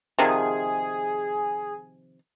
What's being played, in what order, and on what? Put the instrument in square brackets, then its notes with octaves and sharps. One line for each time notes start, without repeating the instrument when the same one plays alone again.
[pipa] C3 D#3 F3 [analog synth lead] G#4